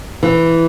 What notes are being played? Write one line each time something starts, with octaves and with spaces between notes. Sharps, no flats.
E3